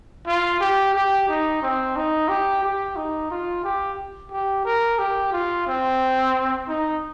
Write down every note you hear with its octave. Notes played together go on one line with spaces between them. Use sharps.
F4
G4
G4
D#4
C4
D#4
G4
G4
D#4
F4
G4
G4
A#4
G4
F4
C4
D#4